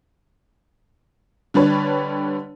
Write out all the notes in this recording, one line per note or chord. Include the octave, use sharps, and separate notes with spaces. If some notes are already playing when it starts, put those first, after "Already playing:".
D3 G3 D4 B4 C#5